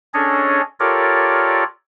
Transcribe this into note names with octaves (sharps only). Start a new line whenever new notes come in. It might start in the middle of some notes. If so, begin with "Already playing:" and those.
C#4 D4 G#4 A4 C#5 D#5
F4 G4 A4 A#4 C#5 D5